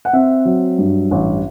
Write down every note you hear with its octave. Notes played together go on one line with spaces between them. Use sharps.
F#5
C4 E5
F#3
G2
A1